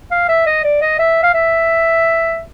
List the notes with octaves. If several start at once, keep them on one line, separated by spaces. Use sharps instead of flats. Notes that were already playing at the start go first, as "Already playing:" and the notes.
F5
E5
D#5
D5
D#5
E5
F5
E5